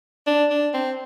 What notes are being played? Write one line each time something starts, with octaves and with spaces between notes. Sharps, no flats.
D4
D4
C4